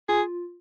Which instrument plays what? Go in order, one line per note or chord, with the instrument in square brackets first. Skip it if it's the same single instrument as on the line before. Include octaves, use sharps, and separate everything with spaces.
[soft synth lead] F4 [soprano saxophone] G#4